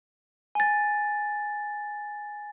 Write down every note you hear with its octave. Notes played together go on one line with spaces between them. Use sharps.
G#5 A6